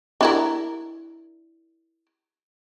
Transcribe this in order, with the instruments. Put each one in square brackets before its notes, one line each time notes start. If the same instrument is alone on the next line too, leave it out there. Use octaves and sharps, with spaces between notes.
[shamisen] D4 E4 A#4